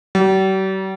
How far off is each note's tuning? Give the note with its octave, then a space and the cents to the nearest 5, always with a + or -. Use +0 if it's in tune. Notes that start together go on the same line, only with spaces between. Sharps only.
G3 -45